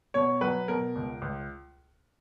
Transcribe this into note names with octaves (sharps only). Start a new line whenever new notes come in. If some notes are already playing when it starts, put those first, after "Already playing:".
B2 C#5
F#3 B4
B2 A#4
C#2
C#2